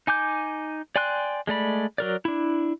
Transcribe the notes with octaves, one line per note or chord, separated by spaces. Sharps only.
D#4 G#5 D6 G6
D5 G5 G#5 C6 F#6
G#3 A3 D5 B5
F#3 A#4 D5
D4 E4